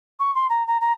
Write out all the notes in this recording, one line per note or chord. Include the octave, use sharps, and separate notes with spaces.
C#6
C6
A#5
A#5
A#5